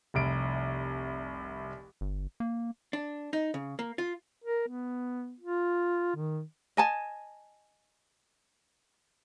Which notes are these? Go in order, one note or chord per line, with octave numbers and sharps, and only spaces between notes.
F1 C2 D7
G1
A#3
D4
D#4
C#3
A#3
F4
A#4
B3
F4
D#3
D#5 G#5 A5